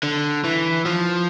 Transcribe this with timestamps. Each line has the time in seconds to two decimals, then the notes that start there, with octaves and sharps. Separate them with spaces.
0.03 D3
0.44 E3
0.86 F3